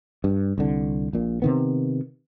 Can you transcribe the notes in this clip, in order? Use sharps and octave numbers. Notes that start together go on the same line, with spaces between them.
G2
C2 D3
A#1 A#2
C3 D#3 B3